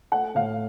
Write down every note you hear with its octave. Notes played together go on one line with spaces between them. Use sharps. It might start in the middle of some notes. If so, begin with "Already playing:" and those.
A3 F#5
A2 F5